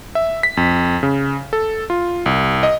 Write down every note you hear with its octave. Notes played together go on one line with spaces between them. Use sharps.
E5
B6
F2
C#3
A4
F4
C2
D#5